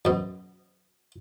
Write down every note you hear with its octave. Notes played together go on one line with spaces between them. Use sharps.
F#2 B2